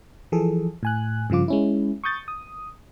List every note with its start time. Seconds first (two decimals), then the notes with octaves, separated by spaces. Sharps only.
0.32 E3 F3 G#4 A4
0.83 A2 G#5 F#6
1.30 G2 C#3 F3 F4 D6
1.48 G#3 C#4 E4
2.04 C#6 D#6 G6 A6
2.28 D#6